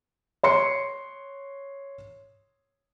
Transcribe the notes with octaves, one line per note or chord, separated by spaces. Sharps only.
C#5 C6 C#7